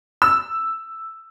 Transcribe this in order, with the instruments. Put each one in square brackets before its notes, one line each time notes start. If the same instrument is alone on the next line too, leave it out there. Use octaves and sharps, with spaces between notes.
[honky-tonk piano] E6